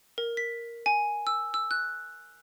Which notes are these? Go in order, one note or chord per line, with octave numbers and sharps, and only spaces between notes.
A#4
B6
G#5
E6
E6
F#6